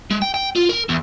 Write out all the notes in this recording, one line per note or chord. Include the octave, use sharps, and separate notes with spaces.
G#3
G5
G5
F4
A#4
E2